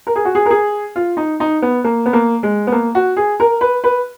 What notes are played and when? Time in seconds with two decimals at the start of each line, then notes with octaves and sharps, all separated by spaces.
0.07 A#4
0.16 G#4
0.25 F#4
0.35 G#4
0.46 A#4
0.51 G#4
0.96 F4
1.17 D#4
1.40 D#4
1.62 B3
1.84 A#3
2.06 B3
2.13 A#3
2.43 G#3
2.67 B3
2.72 A#3
2.95 F#4
3.17 G#4
3.40 A#4
3.61 B4
3.84 B4